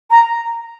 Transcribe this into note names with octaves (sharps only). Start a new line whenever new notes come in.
A#5